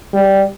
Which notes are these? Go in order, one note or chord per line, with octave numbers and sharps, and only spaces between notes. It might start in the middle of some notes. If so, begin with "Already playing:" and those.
G3